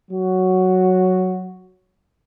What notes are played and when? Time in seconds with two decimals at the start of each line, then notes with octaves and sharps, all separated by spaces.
0.11 F#3 F#4